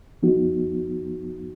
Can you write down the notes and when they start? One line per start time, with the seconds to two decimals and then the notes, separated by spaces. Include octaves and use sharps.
0.23 F3 B3 D#4 F#4